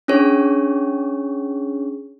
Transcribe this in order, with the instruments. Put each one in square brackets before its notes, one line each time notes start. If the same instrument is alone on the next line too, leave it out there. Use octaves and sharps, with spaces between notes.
[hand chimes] C#4 D4 G#4 C#5